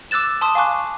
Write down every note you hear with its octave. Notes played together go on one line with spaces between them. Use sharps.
D6 E6 F#6 A6 E7
A5 C6 D#6
F5 G#5 C#6 D6 F#6